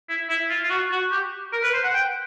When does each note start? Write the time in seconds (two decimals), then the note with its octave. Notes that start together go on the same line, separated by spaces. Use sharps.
0.09 E4
0.29 E4
0.50 F4
0.63 F4
0.70 F#4
0.91 F#4
1.12 G4
1.53 A#4
1.63 B4
1.73 C5
1.84 F#5
1.94 G5